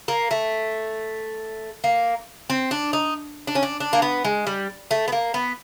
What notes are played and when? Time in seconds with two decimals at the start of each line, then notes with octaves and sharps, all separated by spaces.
0.08 A#3
0.31 A3
1.84 A#3
2.50 C4
2.71 D4
2.93 D#4
3.47 D4
3.55 C#4
3.63 D4
3.80 D4
3.93 A#3
4.02 B3
4.25 G#3
4.47 G3
4.91 A3
5.08 B3
5.12 A#3
5.34 B3